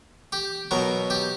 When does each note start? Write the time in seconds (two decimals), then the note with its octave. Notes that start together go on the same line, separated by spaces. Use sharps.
0.32 G4
0.71 B2 F#3 A#4
1.10 G4